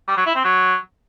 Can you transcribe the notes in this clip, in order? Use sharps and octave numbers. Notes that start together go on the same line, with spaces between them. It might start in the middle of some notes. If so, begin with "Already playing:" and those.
G3
F#3
E4
C4
F#3